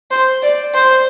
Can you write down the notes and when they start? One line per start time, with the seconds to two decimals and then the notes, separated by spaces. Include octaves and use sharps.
0.11 C5
0.43 D5
0.74 C5